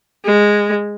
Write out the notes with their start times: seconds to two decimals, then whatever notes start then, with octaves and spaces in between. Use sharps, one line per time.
0.25 G#3